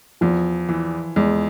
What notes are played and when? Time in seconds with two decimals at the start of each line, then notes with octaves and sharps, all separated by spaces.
0.21 E2 F3 F4
0.69 E3
1.16 E2 G#3